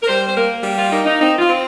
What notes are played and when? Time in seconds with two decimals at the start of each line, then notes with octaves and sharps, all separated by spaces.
0.02 A#4
0.08 G3 C5
0.27 C5
0.36 A#3 A#4
0.63 G3
0.78 F4
0.92 A#3 D#4
1.06 D#4
1.20 C4 D#4
1.39 F4
1.48 C4